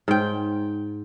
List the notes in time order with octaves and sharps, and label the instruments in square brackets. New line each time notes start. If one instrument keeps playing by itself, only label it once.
[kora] G#2 G5